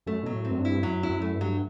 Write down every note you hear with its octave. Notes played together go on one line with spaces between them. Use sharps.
F#2 A3
B2 F#3
A2
C4
F#2
G2
E4
F#2 F#3
E4
F#2
A3
G2
F#3